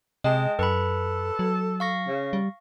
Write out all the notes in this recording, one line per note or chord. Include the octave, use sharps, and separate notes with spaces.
C3 G#3 D#5 G5 A5
F#2 A4 B4 B5
F#3
F5 C#6 A#6
C#3
G3